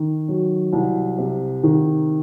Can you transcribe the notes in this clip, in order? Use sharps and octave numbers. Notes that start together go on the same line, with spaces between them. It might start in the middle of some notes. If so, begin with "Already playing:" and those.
Already playing: D#3
F#3
C2
C3
D#3